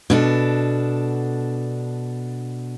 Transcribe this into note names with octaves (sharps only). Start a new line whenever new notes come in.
B2 D4 A4